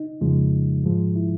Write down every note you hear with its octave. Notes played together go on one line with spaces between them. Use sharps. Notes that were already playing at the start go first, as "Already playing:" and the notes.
Already playing: D#4
F2 C#3 F3 G#3
G#2 F3 G#3
E4